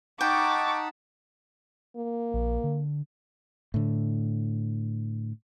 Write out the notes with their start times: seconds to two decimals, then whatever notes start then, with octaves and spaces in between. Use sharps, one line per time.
0.21 D#4 F#5 G5 A5 B5 C#6 D6
1.96 A#3
2.34 A#1
2.64 D3
3.74 A2 D3